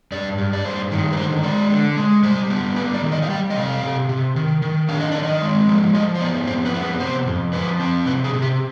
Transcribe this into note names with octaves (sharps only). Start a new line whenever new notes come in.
G2 D5
G2
D5
G2 C5
D#3
B4
D3 C5
G#3 D5
D3
G#3
G3 C5
B3
G3 B4
D5
D#3
D#5
F5
G3 G5
D#5
C3 F5
C3
C3
D#3
D#3
D4 F5
D#5
D#3 D5
D#5
G#3
F3
F3 D#5
C5
B3 D5
F2 C5
B4
B3
B4
C3 C5
F2
F3 B4
C4
C3 B4
G#4
C3
G4